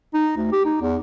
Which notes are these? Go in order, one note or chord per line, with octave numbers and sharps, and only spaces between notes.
D#4
D2
G4
D#4
E2